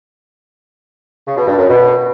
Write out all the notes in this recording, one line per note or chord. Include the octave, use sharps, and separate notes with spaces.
C#3
B2
G2
F#2
B2